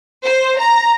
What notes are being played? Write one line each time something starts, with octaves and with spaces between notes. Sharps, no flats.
C5
A#5